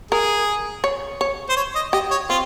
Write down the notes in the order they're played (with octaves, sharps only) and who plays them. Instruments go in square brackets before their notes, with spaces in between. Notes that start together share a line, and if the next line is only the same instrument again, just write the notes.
[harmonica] G#4 [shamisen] A#4
[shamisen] C#5
C#5
[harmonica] C5
C#5
D#5
[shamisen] G4 [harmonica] D#5
[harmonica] C#5
[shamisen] C4 [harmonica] F4